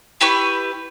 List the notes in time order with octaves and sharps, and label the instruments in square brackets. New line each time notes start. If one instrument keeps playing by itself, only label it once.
[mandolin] E4 G4 B4 C#6